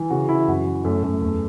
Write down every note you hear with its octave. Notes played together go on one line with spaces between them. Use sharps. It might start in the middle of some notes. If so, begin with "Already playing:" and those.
Already playing: E3
C#3 F#4
E3 E4
F#2 F#4
E3
F#2 A3
F#2 A3
E2 A3